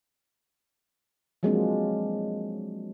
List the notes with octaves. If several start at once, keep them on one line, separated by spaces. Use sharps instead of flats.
F3 F#3 G#3 A#3 C4 D4